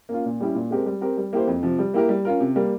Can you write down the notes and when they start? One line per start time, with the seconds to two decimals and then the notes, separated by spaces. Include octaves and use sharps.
0.09 A#3 C#4 F4
0.25 A#2
0.41 G3 C#4 E4 G4
0.55 A#2
0.71 G#3 C4 G4 A#4
0.86 G3
1.01 C4 G4 A#4
1.17 G3
1.33 A#3 E4 G4 C5
1.47 F2
1.63 C3 F3
1.79 G3
1.94 A#3 E4 G4 A#4
2.09 G3
2.25 C#4 F4 A#4
2.40 C3
2.56 G3 A#3